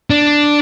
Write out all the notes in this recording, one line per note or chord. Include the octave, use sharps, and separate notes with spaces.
D4